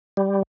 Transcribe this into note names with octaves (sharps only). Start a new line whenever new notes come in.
G3